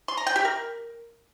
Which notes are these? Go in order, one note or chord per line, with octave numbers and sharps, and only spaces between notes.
C6
A#5
G5
G4
A#4